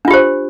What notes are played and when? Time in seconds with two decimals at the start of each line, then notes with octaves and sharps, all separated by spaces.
0.05 D4
0.08 F4
0.11 G4
0.14 C5